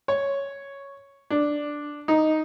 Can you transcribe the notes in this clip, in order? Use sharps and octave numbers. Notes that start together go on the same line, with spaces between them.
C#5
D4
D#4